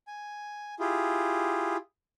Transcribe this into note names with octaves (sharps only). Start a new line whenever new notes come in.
G#5
E4 F4 G4 G#4